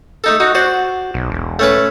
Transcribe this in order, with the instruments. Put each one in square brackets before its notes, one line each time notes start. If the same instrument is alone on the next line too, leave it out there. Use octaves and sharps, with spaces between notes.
[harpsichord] A3 D#4 A4
[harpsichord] D#4 [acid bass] F#4
[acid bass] F#4 [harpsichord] C5 D5
[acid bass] B1
E1
[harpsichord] A3 C#4 B4